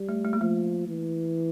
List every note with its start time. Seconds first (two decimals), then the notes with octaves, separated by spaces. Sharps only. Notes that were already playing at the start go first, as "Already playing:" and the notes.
Already playing: G3
0.09 A3
0.25 A3
0.33 A#3
0.41 F3 A3
0.88 E3